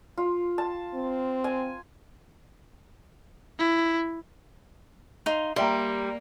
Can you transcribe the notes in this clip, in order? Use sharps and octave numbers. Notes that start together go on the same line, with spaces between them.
F4
A5
C4
G#5
E4
D#4 F5 C6
G3 A#3 E5 G5 A#5 C6